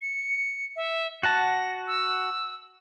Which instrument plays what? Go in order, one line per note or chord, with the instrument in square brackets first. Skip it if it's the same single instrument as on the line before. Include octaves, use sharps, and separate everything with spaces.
[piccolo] C#7
E5
[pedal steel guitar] F#4 F#5 A5 [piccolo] A#6
[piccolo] E6